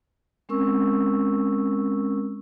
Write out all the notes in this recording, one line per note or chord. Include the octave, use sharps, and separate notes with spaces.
G#3 C4 C#4 A#4 C#6 E6